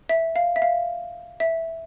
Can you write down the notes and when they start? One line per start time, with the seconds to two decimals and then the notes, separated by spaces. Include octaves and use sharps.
0.09 E5
0.36 F5
0.56 E5
0.62 F5
1.40 E5